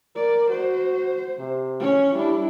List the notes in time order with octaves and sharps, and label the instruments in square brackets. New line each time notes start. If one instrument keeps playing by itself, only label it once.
[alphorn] A#4 [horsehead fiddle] D5
[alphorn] F#4 [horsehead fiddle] C5
[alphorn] C3
[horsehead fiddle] C#4 C#5
[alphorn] G3 [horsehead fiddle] D4 E4